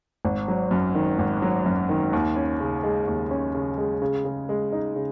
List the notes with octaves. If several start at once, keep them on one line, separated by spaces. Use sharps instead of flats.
G#1
F#3
F#2
D#3
G#1
F#3
F#2
D#3
D#2
C#4
C#3
G#3
D#2
C#4
C#3
G#3
C#3
C#3
G#3
D#4
C#3